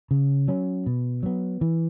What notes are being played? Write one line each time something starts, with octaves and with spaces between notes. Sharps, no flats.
C#3
F#3 C#4
B2
F#3 B3
E3